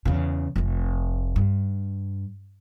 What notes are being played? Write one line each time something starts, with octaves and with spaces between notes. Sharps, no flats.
E2 C#3
F1 A3
G2